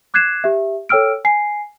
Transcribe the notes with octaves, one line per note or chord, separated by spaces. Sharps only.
D6 F#6 G#6 C7 E7
G4 E5
A4 C#5 G5 E6 F6 D7
G#5 C7